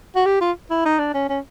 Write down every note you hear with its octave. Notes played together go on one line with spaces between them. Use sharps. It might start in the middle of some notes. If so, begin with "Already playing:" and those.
F#4
G4
F4
E4
D#4
D4
C#4
C#4